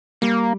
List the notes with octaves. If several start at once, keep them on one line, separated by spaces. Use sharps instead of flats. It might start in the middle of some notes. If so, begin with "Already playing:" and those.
G3 A#3